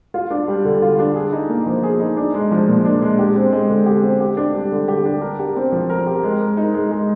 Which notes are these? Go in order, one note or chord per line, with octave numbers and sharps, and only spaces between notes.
F4
D4
G3
D3
F4
D4
G#4
D#4
A#3
F3
G#4
D#4
D4
G#3
F3
A#2
D4
G#3
G4
C4
G#3
D3
G4
C4
G4
D4
G3
D3
G4
D4
A#4
G4
C4
F3
A#4
G4
G#3
A#4
D#4
G#3
G#3